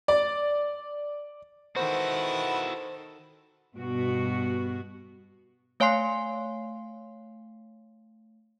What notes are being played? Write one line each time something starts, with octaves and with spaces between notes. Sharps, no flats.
D5
D#3 E4 F#4 A4 B4 C5 F#5
G2 B2 B3 F#4
A3 C#5 F5 G#5 C6 C7